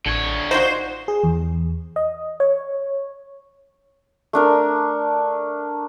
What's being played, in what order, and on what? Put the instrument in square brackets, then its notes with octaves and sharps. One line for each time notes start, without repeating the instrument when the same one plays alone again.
[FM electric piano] A1 [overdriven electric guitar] D3 C#5
[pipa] D#4 F4 F#4 [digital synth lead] C5 [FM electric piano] D5
[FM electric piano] G#4
E2
D#5
C#5
[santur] A3 D4 A#4